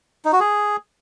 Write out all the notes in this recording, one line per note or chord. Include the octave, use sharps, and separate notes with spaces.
D#4
F#4
G#4